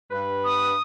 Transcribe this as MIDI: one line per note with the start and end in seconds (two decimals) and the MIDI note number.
0.11 0.74 43
0.11 0.74 71
0.44 0.82 87